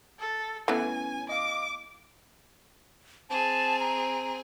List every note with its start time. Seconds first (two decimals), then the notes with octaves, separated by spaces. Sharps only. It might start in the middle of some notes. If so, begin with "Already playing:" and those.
0.19 A4
0.68 E3 A3 B3 C#4 G#5
1.29 D#5 F5 D6
3.30 C4 G#4 A5
3.80 A#5